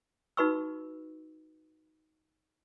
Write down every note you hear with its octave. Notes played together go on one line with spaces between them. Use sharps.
D#4 F#4 B4 B5 C#6 E6